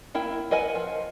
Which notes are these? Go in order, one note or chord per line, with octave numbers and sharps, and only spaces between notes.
A#3 E4 G5
A#4 B4 D#5 F#5 G#5
F3